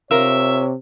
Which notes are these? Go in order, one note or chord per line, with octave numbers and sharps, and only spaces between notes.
C3 F4 A#4 C#5 E5